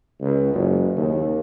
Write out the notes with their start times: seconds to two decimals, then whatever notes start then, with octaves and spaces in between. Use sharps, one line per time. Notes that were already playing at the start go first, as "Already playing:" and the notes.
0.21 C#2
0.54 F#1
0.97 D#2